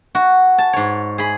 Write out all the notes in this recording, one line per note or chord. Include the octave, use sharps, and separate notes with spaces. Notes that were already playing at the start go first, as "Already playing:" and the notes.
F#4
A5
G#2 C#5
G#4 B5